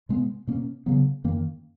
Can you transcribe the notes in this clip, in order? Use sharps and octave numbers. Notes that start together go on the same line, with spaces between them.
B2 G#3 B3
B2 A#3 C#4
C#3 F#3 B3
F#2 D#3 A#3